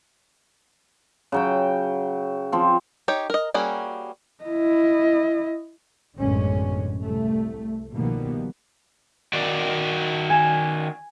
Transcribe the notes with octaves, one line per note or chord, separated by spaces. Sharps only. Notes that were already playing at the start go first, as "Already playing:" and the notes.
C#3 F#3 G5
F3 C4
D#4 G4 C#5
A#4 D#5
G3 A#3 C#4 F#4 G#4
E4 D#5
A1 F#2 B2 D3 G#3 C#4
C2 A3
B2 D#3 F3 G3 A#3 B3
D#3 F#4 D5
G#5 E7